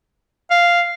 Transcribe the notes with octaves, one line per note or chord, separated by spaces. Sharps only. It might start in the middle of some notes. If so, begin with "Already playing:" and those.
F5